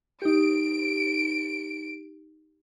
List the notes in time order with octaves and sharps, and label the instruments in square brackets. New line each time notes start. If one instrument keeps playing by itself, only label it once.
[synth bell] D#4 G4 [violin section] D7